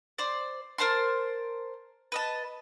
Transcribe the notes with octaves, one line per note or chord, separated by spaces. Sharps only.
C5 D5
A#4 C5 A5 C6
B4 D#5 A5